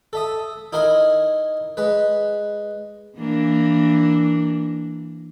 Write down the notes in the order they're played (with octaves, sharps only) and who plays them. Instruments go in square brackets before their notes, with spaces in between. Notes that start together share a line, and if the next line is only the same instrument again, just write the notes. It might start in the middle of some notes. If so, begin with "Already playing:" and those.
[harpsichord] A4 E5 D#6
D#4 E4 A#4 G#5 C6
G#3 B4
[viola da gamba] E3 A#3 D4